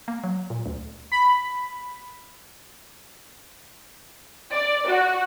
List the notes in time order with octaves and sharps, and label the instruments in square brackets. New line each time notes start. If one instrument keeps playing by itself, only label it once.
[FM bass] A#3
F#3
A#2
D2
[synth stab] B5
[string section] D5
F#4